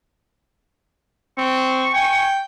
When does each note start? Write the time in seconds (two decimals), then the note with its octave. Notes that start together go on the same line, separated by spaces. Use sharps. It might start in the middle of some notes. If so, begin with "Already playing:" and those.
1.38 C4 C#6
1.93 G5 G#5